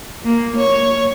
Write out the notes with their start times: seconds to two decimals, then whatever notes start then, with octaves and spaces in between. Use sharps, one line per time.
0.24 A#3
0.57 C#5